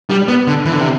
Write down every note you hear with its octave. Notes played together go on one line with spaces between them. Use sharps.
G3
B3
D3
E3
D3
C3